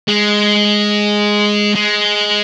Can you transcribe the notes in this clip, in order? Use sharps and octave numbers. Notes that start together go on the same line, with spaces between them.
G#3
G#3